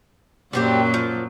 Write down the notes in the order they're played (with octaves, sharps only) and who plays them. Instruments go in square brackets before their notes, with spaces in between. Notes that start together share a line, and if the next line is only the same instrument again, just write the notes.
[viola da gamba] F#2 A#2 F#3 [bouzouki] G3 C4 G4
[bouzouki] F3